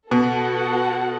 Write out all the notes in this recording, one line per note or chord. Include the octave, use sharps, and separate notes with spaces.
B2 B3 F#4 A4 F#5